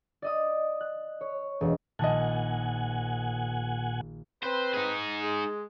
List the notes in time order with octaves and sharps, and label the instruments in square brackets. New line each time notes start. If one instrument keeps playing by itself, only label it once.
[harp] D5 D#5 D#6
F#6
C#5
E1
[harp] A#1 D#3 F#6 [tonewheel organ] A#2 F#5 G#5 [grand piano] D#5 A5
[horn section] C4 B4 [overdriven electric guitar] C5
[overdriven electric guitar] D#4 G#4
[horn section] G#3